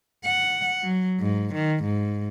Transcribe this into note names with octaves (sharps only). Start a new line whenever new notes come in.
F#5
F#3
G#2
D#3
G#2